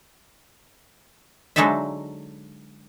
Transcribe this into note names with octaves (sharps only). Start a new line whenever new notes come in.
D3 F#3 G#3 D#4 A4 E5